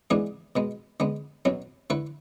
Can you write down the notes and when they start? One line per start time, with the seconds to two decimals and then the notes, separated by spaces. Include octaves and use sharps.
0.10 G#2 E3 B3 D4 G#4
0.56 B2 G#3 B3
1.00 D3 G#3 B3
1.45 B1 B2 F#3 C#4
1.90 D3 A3 E4 B4